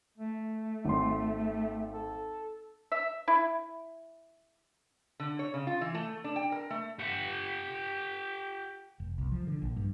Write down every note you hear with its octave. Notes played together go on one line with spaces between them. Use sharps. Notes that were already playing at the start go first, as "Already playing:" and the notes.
A3
G#1 C6
A4
E5
E4
D3
C#5
C#3
F4
E3
A3
D4
G5
A#4
A3
G4 F#5
F1
C2
F3
D3
A#1
G2